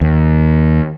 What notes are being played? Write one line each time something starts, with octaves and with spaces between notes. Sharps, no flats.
D#2